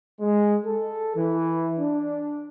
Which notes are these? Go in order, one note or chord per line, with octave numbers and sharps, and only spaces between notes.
G#3
A4
E3
D4